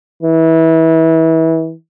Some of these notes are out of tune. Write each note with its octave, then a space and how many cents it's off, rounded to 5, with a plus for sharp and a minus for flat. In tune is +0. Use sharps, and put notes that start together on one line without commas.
E3 -25